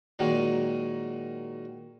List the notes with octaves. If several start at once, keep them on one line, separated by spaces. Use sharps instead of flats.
A#2 D#3 F#3 G#3 A#3